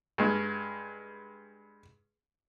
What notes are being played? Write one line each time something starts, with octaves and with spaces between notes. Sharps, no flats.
G2 G#3